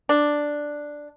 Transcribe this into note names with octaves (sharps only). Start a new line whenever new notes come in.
D4